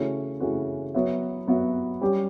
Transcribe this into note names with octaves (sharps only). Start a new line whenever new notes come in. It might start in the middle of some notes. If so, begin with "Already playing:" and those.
Already playing: C#3 E3 A3 C#4 F#4
C#3 E3 A3 C#4 F#4
F#3 B3 F#4 C#5 E5
F#3 B3 F#4 C#5 E5
G3 C#4 G4